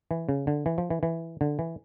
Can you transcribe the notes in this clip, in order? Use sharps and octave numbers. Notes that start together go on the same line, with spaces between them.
E3
C#3
D3
E3
F3
E3
E3
D3
E3